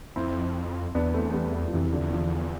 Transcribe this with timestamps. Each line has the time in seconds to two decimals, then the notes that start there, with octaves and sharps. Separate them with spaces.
0.16 F2 C4 E4
0.95 E2 B3 D4
1.14 A3 C4
1.30 A3
1.34 G3 B3
1.68 F3
1.73 F2 C3 E3
1.87 E2
1.93 D3 F3
2.00 E2
2.12 D3 F3